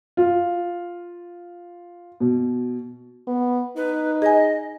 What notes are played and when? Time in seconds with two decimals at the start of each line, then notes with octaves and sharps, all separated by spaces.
0.17 F4
2.20 B2
3.27 B3
3.77 D#4 B4
4.22 G#4 D#5 G#5